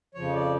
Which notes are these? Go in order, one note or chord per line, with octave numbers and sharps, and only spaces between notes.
F2 C#3 F3 C#5
D5